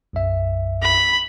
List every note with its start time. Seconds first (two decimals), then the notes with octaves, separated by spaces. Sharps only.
0.13 B1 F#2 E5
0.83 B5